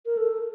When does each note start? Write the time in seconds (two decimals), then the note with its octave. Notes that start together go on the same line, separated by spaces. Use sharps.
0.06 A#4
0.17 A4